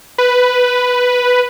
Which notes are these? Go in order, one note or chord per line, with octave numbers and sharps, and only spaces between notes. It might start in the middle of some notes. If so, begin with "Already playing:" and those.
B4